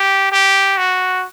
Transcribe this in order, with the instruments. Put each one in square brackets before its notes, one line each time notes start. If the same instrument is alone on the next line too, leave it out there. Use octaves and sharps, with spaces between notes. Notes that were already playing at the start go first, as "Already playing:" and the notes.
Already playing: [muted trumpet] G4
G4
F#4